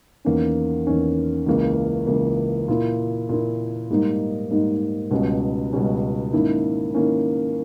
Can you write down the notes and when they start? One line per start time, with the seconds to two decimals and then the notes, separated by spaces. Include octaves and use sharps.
0.25 E2 D#3 A#3 C#4
0.87 E2 D#3 A#3 C#4
1.46 C#2 C#3 E3 A#3
2.07 C#2 C#3 E3 A#3
2.68 A#2 A#3 E4
3.29 A#2 A#3 E4
3.90 G#2 G3 A#3 D#4
4.51 G#2 G3 A#3 D#4
5.11 C#2 B2 G3 C#4
5.73 C#2 B2 G3 C#4
6.33 G#2 D#3 A#3 C#4 E4
6.94 D#3 A#3 C#4 E4